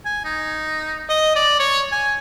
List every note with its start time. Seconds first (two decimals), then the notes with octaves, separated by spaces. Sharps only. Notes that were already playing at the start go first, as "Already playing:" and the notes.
0.05 G#5
0.25 D#4
1.09 D#5
1.36 D5
1.60 C#5
1.92 G#5